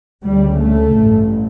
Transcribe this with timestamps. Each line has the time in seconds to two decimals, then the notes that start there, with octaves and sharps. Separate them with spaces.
0.25 D2 C#3 G3
0.60 A3
0.94 A1 G2